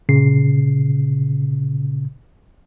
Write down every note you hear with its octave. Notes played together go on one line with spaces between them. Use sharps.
A#2 C#3 C7